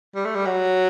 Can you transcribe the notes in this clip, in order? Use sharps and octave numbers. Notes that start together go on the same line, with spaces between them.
G3
A3
G3
F#3